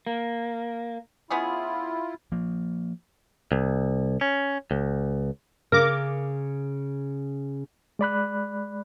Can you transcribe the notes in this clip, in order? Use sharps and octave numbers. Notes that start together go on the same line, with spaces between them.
A#3
B3 C#4 E4 F4 G#4
F3 A#3
C2
C#4
C#2
C#3 A#4 D6
G#3 D5 B5 F#6